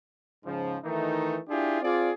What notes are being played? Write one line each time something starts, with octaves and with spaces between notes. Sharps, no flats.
G#2 C#3 F3
D#3 E3 A3 D#4
D4 E4 F4 G4 G#4
C4 F4 G#4 D5